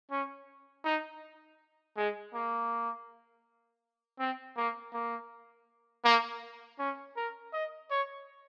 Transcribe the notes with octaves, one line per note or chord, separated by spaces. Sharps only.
C#4
D#4
G#3
A#3
C4
A#3
A#3
A#3
C#4
A#4
D#5
C#5